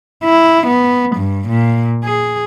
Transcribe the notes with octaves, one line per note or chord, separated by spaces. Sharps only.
E4
B3
G2
A#2
G#4